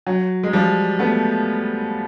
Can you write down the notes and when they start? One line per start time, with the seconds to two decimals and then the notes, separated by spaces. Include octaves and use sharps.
0.07 F#3
0.43 G#3
0.53 F3 G3
0.99 A3 B3